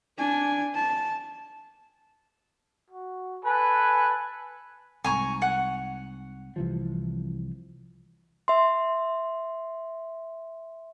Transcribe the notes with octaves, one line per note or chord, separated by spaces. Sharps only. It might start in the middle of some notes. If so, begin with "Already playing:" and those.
D4 G#5
A5
F#4
A4 B4 G#5
C2 G#2 G#5 A#5 C#6
F#5
C2 E3 F3
E5 C6